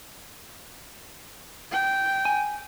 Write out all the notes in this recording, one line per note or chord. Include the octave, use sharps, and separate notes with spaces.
G5
G#5